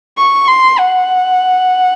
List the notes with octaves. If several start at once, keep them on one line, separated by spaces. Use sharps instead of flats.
C#6
C6
F#5